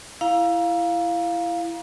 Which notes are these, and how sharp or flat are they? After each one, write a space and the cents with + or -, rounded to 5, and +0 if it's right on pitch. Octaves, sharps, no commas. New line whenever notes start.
E4 +20 F5 +5 A#5 +25